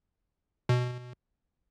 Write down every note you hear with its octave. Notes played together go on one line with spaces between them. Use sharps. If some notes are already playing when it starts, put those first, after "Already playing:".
B2